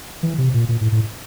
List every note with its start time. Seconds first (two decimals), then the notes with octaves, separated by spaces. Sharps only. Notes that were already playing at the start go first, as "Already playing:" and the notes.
0.23 E3
0.38 C3
0.54 A#2
0.69 A#2
0.81 A2
0.92 A2